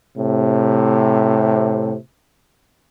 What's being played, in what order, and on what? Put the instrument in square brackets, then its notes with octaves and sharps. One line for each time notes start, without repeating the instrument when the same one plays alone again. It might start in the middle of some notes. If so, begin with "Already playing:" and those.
[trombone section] A2 C3